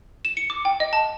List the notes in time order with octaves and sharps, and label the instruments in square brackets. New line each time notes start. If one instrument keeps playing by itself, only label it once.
[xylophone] E7
C#7
D6
G5
D#5
A5